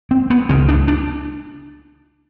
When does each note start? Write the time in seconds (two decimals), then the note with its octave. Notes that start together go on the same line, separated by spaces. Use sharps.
0.11 C4
0.30 B3
0.49 C#2 C#3 C4
0.69 D4
0.88 D4